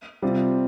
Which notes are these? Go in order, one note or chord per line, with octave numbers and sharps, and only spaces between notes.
C3 G3 C4 F4